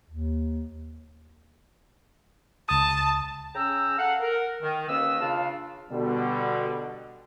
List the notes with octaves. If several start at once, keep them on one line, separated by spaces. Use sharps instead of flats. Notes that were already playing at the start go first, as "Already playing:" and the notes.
D#2
C#2 A5 D#6
C#3 C#4 G5 A#5 E6
A4 F5 F#5
A#4
D#3
D#2 A#3 C#4 B4 D#5 E6
C#3 D4 F4 F5
B2 D3 G3